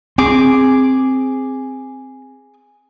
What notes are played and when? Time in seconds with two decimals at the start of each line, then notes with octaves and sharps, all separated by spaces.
0.18 C4 G#4 D6